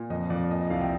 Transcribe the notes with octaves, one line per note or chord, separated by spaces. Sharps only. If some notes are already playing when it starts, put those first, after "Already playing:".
Already playing: A#2
F2 D#5
F2 D5
A#2 D#5
D#5
C2 D5 F5
D#5 G5